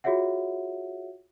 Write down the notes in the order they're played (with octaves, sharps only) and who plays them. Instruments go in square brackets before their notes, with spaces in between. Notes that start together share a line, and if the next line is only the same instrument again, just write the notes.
[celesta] F4 F#4 G#4 C#5 E5 F#5